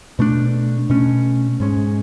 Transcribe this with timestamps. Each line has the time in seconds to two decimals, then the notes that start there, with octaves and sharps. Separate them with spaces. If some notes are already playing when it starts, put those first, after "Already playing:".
0.19 B2 A3 D4
0.90 B2 A3 C#4
1.60 G#2 G#3 C#4